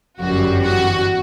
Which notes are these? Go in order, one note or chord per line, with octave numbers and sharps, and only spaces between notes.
G1 F#2 E3 G3 F#4
F#4